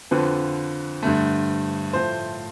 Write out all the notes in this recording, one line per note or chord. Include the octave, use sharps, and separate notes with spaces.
F2 D3 F3 B4
G2 D3 A3
A2 F3 A3 C5